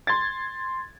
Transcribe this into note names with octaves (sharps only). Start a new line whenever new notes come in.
C6 G#6 A6